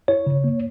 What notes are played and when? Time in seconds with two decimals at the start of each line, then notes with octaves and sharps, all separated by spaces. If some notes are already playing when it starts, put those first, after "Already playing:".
0.08 E4 C#5
0.26 C#3
0.44 A#3